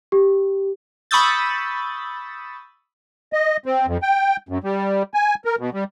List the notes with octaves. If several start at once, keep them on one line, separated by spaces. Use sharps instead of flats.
G4
B5 C#6 D#6 E6 G6 A6
D#5
C4
F2
G5
F#2
G3
G#5
A#4
B2
G3